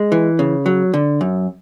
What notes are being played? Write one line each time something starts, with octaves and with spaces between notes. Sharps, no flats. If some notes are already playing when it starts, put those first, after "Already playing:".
Already playing: G#3
E3
C#3
F#3
D3
F#2